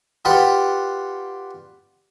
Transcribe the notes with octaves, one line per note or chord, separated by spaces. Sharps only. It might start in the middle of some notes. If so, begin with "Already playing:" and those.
F4 G4 B4 D5 F#5